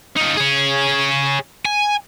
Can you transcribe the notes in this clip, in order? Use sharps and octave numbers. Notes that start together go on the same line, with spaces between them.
D#4 F4
G#4 C#5
G#5